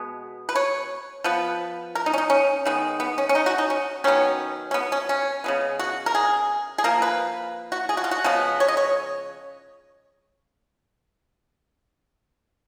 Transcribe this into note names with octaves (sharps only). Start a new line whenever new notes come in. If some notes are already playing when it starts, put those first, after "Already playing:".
Already playing: B2 G#3 B3
B4
C#5
F3 B3 B4
A#4
D#4
C#4
D#4
C#4
D#3 G#3 B3
B3
C#4
C#4
D#4
F#4
D#4
C#4
D#3 F#3 B3 C#4
C#4
B3
C#4
C#4
C#3 G#3 B3
F#4
A#4
G#4
G#4
F3 A#3 A#4
B4
F#4
G#4
F#4
F4
F#4
C#3 F3 G#3 B3
C#5
D#5
C#5